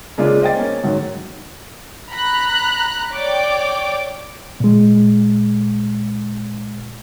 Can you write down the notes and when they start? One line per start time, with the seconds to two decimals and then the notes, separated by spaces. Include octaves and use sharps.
0.18 C#3 G#3 A#3 D4 F4 G#4
0.41 C5 D#5 G5 A6
0.56 A#3 C#4
0.84 G#2 D#3 F#3
2.11 A#5 B5 F#6
3.13 C#5 D5 G5 D6
4.60 A#2 G#3